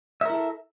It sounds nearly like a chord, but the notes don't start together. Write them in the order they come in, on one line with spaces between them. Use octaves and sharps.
E5 A#4 E4 A4